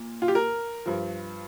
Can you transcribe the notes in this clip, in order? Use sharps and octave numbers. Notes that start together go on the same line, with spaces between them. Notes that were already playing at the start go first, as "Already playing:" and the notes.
Already playing: A#2
F4
G4
A#4
G2 F3